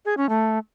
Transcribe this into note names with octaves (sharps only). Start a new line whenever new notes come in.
G#4
C#4
A3